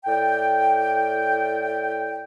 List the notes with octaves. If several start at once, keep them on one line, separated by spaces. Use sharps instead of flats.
A2 D5 G5